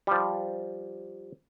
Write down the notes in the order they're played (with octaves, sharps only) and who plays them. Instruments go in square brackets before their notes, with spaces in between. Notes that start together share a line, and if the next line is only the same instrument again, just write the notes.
[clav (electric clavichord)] F3 G3